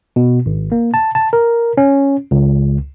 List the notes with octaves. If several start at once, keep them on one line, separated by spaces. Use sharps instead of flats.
B2
G#1
A#3
A5
A5
A#4
C#4
C#2